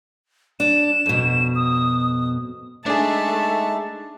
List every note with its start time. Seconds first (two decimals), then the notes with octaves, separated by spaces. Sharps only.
0.60 D4 E7
1.06 F2 B2
1.55 D#6
2.86 G#3 A3 D4 D#4 G#4 E5 A5